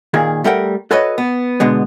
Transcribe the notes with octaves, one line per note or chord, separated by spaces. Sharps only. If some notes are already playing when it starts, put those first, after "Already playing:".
A#2 D#3 A#3 G#4
G3 A3 A4 A#4 F#5 G5
F#4 A4 B4 C#5 D#5
B3
B2 D3 G#3 B3